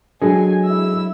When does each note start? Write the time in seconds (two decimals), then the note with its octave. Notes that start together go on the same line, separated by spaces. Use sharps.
0.22 F#3 G#3 D4 F#4 G#4 A4 G#5
0.65 E4 E6